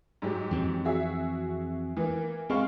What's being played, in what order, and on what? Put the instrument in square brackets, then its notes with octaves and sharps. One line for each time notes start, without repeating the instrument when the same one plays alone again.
[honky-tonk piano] G#2 F#3 G4
[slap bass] F2 E3 C4
[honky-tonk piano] F#4 G#4 E5
E3 A#3
[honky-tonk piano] G#3 F5 C#6 [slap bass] C4